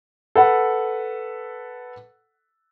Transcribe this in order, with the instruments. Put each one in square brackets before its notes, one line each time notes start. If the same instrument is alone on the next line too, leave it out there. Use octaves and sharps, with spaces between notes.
[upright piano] A4 B4 F#5